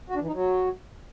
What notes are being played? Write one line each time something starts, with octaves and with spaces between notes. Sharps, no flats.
F#4
D4
E3
D#4
F#3